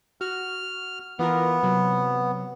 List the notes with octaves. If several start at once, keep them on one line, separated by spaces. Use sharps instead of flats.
F#4 F6
E3 B3 F4 A#4
C3 F#3